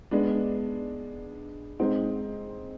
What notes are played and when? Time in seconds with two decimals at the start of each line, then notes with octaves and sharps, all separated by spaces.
0.11 G#3 B3 D4
1.79 G#3 C4 D#4